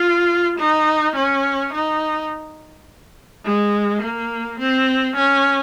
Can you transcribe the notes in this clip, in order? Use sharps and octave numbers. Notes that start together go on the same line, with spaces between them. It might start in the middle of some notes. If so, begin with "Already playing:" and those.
Already playing: F4
D#4
C#4
D#4
G#3
A#3
C4
C#4